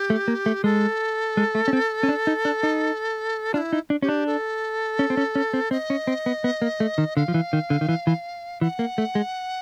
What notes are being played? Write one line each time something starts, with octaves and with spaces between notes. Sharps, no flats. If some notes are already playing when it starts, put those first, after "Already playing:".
Already playing: G4
A3
A#3
A3
G#3 A4
G#3
A3
C#4
C4
C#4
D4
D#4
D4
D#4
D4 F4
E4
D#4
D4
C#4 G4
D4
A4
C#4
C4
C#4
C#4
C4
C4 D#5
C#4
C4
B3
B3
A#3
A3
D#3
D3 F5
F3
E3
D#3
D3
D#3
E3
E3
E3 F#5
A#3
A3
G#3